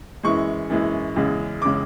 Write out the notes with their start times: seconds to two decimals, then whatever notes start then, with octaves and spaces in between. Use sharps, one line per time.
0.23 F#2 E3 G#3 C#6
0.70 F#2 E3 G#3
1.16 E2 C#3 G#3
1.62 C#3 G#3 D6